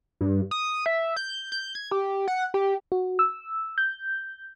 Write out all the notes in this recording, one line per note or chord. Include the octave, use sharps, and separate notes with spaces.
G2
D#6
E5
G6
G6
G#6
G4
F#5
G4
F#4
E6
G6